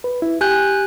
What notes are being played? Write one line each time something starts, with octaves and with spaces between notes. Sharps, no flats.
B4
E4
G4 G#5 F#6 G6